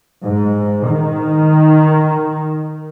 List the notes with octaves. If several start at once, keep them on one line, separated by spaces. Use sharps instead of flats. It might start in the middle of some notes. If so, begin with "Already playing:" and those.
G#2
D#3